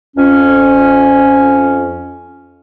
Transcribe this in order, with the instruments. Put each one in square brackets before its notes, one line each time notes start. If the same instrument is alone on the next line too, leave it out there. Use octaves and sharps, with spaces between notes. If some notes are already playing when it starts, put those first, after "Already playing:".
[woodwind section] F2 C#4